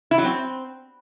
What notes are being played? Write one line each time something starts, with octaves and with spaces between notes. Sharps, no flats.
E4
F#3
C4